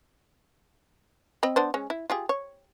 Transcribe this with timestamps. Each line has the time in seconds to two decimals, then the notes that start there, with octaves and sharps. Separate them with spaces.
1.43 C4 D#5 B5
1.56 B3 D4 C5
1.74 G#3 C#4
1.90 E4
2.10 F4 G4 G#4
2.29 C#5